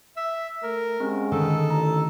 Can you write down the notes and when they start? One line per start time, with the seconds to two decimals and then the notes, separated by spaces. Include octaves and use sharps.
0.17 E5
0.63 A3 A#4
1.00 G#3 C4 C#4 G4
1.32 D3 D#3 A3 A4 D#6
1.71 A1 A#5